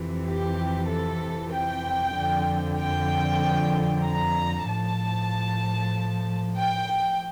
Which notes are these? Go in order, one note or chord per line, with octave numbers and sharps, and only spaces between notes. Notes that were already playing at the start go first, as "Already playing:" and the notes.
Already playing: F2 C3 E3
G4
A4
G5
F2 D3 F3
G5
A#5
A2 F3 A5
G5